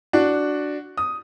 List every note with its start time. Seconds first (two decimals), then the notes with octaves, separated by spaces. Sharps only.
0.13 D4 F#4
0.98 D#6